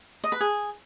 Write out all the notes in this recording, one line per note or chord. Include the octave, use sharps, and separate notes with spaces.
D#5
B4
G#4